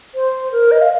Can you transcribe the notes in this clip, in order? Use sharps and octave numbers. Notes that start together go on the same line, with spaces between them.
C5
A#4
D#5
F5